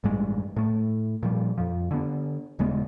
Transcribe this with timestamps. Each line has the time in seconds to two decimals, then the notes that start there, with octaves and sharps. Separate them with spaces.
0.04 A1 G2 G3 G#3
0.56 A2 A3
1.23 A#2 F3 G3
1.58 F2 F3
1.91 D3 B3
2.59 D#1 C#3 G#3 B3